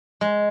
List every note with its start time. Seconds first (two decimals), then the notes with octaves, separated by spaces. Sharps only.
0.21 G#3